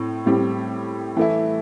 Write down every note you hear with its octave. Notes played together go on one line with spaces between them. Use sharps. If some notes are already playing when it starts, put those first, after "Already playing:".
Already playing: A2 C4
A2 G3 C4
E3 A3 E4